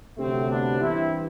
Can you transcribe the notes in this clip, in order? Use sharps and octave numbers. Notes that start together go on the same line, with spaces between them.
D2 C3 F#3 A3 C4
B3 D4
G2 E3 G3 C4 E4